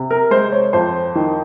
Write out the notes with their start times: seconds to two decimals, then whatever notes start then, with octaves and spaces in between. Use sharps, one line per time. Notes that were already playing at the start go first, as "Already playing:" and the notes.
Already playing: C3
0.11 A#4
0.31 G#3 C5
0.52 C#5
0.73 F2 C5
1.15 D#3